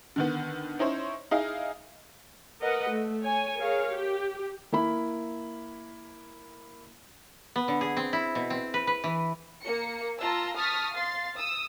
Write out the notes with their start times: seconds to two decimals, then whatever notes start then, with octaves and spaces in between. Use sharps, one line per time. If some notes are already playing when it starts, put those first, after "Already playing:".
0.16 D3 D#3 B3
0.79 C#4 D#4 E4 C5 C#5
1.31 D#4 E4 G#4 D#5 F5
2.59 A#4 B4 D#5 F#5
2.88 A3
3.22 C#5 G#5
3.59 G#4 A#4 C#5 F5
3.90 G4
4.72 A#3 E4 B5
7.56 B3
7.68 D3
7.81 G#4
7.97 C4
8.13 E4
8.35 B2
8.50 C4
8.74 B4
8.87 B4
9.04 E3
9.61 A#3 C#7
10.20 F4 A5 A#5 E6
10.55 A5 C#6 D#6 F6 A6 B6
10.93 F5 C6 A6 C7
11.37 D#6 E6